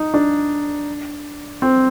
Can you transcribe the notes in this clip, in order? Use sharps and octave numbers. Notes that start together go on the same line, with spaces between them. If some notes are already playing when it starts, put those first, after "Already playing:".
Already playing: D#4
D4
C4